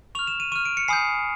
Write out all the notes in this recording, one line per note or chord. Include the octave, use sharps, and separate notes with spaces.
C#6 F6 F7
E7
D#7
C#6 F6 D#7
D7
C#7
G#5 B5 D#6 G6 C7